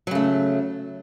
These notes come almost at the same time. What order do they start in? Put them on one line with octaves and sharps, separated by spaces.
F#3 C#3 A3